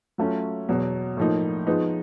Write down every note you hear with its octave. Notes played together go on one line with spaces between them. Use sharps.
F#3 A3 C#4 F4
E2 B2 F#3
A2 F3 A#3 D#4
F3 G#3 B3 D#4